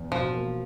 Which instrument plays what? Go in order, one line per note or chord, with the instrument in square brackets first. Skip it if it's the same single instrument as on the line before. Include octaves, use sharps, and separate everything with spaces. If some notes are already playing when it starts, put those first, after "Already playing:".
Already playing: [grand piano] E2
[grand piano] E1 [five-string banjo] F3
[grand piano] A#3